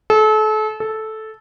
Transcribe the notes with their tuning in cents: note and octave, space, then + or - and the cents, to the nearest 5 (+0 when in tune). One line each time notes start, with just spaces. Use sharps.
A4 -35
A4 -10